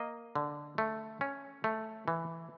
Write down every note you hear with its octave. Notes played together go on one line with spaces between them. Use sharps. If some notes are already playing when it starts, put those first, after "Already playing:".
Already playing: A#3 D#5
D3
A3
C#4
A3
E3